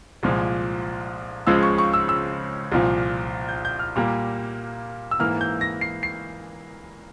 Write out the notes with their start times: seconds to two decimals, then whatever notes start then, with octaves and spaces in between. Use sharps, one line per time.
0.23 C2 A#2 F3 G#3
1.47 C#2 C#3 F3 G#3 E6
1.63 C#6
1.78 C#6
1.94 E6
2.09 E6
2.72 C2 A#2 F3
3.49 G6
3.65 G6
3.79 F6
3.96 A#2 G3 A#3
5.11 E6
5.20 G#2 E3 A#3 F6
5.41 G6
5.61 A#6
5.81 C7
6.03 C7